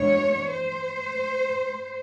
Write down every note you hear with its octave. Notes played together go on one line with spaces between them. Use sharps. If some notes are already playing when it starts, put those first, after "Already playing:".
Already playing: E2 B2 G#3 B3 D4 C#5
C5